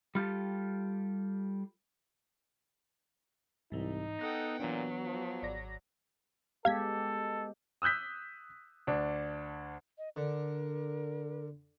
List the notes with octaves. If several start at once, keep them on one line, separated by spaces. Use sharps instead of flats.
G3 F4 G4 A4
C2 G#2 E3 D#4
B3 A4 F#5 G5 D#6 F#6 A#6
A#2 E3 F#3 D4
F3
G#1 D5 A#6
G#3 B3 G4 A4 F5 G#6 B6
D#6 E6 F#6 G6 B6
D2 D4
D#5
D3 A#4